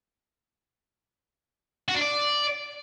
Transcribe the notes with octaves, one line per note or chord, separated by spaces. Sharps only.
F#4
D4
D5